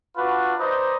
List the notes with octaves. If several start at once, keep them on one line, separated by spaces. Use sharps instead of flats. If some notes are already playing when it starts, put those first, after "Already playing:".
D4 F4 F#4 B4
D#4 B4 C5 D5 D#5